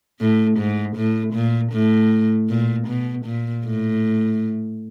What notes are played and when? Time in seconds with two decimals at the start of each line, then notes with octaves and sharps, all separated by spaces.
0.20 A2
0.58 G#2
0.96 A2
1.34 A#2
1.72 A2
2.49 A#2
2.88 B2
3.26 A#2
3.65 A2